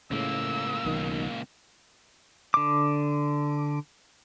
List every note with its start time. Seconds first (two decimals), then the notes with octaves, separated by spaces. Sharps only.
0.11 C#2 A2 C#3 A#3 E6
0.85 B1 D#3
2.54 D3 D6